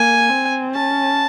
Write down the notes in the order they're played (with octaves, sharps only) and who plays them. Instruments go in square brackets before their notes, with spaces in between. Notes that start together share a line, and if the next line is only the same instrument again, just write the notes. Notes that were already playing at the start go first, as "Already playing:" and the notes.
Already playing: [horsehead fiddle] A#3 [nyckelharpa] G#5
[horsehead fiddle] C4
[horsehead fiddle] C#4 [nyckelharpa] A5